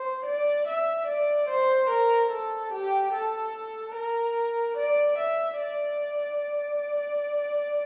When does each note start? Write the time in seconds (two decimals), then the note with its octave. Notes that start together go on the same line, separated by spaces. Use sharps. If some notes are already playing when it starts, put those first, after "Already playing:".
Already playing: C5
0.25 D5
0.67 E5
1.07 D5
1.49 C5
1.90 A#4
2.30 A4
2.72 G4
3.13 A4
3.95 A#4
4.77 D5
5.18 E5
5.59 D5